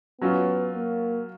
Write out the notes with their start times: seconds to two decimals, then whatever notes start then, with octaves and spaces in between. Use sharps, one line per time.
0.21 F#3 B3 C#4 F4
0.73 A#3